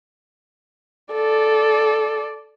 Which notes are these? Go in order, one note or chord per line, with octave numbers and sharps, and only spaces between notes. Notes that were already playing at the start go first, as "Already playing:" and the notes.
A4 D5